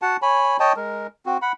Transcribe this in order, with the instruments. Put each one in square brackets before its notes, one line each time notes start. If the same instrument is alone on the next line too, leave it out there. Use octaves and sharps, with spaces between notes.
[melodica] F#4 F#5 A5
C#5 G#5 B5
C#5 D#5 G5 A5
G#3 A#4
C4 F#4
F#5 B5